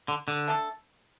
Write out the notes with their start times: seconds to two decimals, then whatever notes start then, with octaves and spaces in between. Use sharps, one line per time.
0.08 D3
0.28 D3
0.48 A3 D4 A4